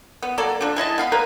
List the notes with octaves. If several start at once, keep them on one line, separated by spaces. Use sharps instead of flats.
B3
F#3 A#3 A4 D5
D3 F3 D4
G#3 E4 D#5 A5
B3 F5 B5
A#3 A#4 B4